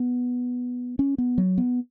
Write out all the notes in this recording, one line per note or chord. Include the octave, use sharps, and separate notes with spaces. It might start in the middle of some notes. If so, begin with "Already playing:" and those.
Already playing: B3
C#4
B3
F#3
B3